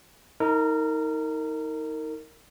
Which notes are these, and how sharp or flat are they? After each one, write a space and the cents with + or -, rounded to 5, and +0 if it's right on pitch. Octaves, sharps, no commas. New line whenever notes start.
D#4 +30 A#4 -25